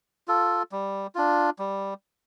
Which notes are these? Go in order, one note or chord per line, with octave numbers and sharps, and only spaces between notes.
F4 A4
G3
D4 F4
G3